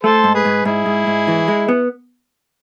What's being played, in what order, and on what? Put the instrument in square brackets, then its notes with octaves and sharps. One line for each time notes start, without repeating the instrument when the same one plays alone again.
[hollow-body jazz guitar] A3 [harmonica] A4 C5
[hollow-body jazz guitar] G#2
[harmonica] G#4 B4
[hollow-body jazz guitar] G#2
[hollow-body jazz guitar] G#2 [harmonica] E4 G#4
[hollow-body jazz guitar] G#2
G#2
E3
G#3
B3